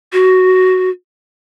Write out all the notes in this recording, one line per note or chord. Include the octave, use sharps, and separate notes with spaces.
F#4